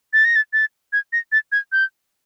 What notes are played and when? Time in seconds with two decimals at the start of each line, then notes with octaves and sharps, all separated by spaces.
0.13 A6
0.25 A#6
0.36 A6
0.53 A6
0.93 G#6
1.13 A#6
1.32 A6
1.52 G#6
1.72 G6